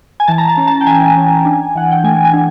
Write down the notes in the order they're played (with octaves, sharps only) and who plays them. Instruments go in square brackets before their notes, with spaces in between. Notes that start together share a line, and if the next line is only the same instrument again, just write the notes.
[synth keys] G#5
E3 A5
A#5
A5
C#4
A5
G5
E3 G#5
C#4
D4
E3 F#5
G5
A3 G#5
G#5
D4